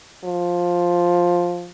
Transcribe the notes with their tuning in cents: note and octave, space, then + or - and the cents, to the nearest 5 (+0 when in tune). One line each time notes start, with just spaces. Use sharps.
F3 +10